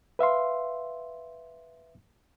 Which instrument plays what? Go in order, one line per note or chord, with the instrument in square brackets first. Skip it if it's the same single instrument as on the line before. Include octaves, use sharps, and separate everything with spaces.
[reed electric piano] B4 E5 F5 C6